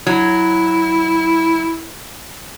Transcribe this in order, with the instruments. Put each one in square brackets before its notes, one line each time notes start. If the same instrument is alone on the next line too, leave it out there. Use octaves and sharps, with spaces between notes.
[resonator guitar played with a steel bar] F#3 [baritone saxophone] E4